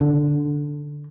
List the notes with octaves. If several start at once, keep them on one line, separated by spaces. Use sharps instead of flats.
D3